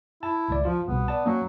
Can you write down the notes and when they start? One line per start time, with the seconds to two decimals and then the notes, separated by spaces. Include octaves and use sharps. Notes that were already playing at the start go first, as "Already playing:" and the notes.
0.23 E4 A5
0.48 G#1 C#2 D5
0.65 F3 F4
0.88 C2 B2 B3
1.08 D5 A5
1.26 F#3 A#3 C#4